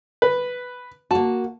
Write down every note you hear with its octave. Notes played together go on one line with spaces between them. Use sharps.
B4
A#3 F#4 A5